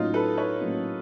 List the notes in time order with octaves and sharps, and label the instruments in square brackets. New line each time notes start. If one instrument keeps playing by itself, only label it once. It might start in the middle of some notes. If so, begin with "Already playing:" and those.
Already playing: [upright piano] A2 F#3 A#3 C#4 [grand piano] D#4 F4
[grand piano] A4 B4
B4 C#5
[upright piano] A2 F#3 A#3 C#4